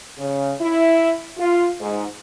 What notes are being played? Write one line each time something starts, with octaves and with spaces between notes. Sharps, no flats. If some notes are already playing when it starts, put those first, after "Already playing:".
C#3
E4
F4
G#2